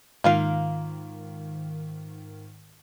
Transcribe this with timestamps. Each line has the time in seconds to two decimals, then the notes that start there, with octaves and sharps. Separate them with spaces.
0.24 G#2 D#3 A#3 F4 F5